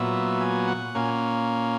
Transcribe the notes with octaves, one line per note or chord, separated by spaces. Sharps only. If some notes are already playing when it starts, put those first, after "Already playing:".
Already playing: A#2 F#3 B3 E5
G#5
F#5
A#2 A#3 C#4 G#5